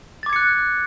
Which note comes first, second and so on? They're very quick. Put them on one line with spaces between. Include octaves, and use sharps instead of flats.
A6 D6 G#6 C#7 F#6